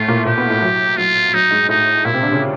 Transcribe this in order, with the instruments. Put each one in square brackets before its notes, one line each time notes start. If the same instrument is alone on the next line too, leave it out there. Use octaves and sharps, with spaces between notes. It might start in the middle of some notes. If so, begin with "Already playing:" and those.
Already playing: [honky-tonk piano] A2 A3 [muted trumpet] F4
[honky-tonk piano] A#2 A#3
[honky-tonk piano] A#2 A#3 [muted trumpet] G4
[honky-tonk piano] B2 B3
A2 A3
F#3
[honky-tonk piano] F#3 [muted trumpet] F4
[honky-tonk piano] F#3 [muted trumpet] D#4
[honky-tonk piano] G#2 G#3
[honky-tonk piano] A2 A3 [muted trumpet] D#4
[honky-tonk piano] A#2 A#3 [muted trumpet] E4
[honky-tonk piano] C3 C4
D3 D4
C#3 C#4